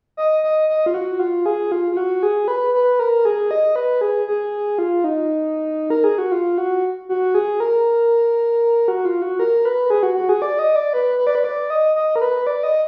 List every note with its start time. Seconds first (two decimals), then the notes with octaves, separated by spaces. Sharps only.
0.17 D#5
0.43 D#5
0.69 D#5
0.86 F4
0.94 F#4
1.19 F4
1.46 G#4
1.72 F4
1.92 F4
1.97 F#4
2.23 G#4
2.48 B4
2.74 B4
2.99 A#4
3.25 G#4
3.51 D#5
3.76 B4
4.01 G#4
4.27 G#4
4.79 F4
5.04 D#4
5.90 A#4
6.04 G#4
6.18 F#4
6.32 F4
6.58 F#4
7.09 F#4
7.35 G#4
7.60 A#4
8.88 F#4
9.05 F4
9.22 F#4
9.39 A#4
9.65 B4
9.90 G#4
10.03 F#4
10.16 F#4
10.29 G#4
10.42 D5
10.59 D#5
10.76 D5
10.93 B4
11.19 B4
11.27 D5
11.35 B4
11.44 D5
11.70 D#5
11.95 D#5
12.16 A#4
12.21 B4
12.47 D5
12.63 D#5